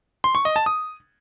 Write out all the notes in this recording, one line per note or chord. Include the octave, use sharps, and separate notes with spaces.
C6
C#6
D#5
A5
D#6